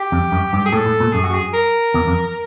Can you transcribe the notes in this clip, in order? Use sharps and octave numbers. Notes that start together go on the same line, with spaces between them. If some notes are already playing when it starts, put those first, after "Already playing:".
Already playing: G4
F2
F#2
G2
G#4
A2 A4
A2
A#2
F#2 G#4
F#4
G#4
A#4
E2
F2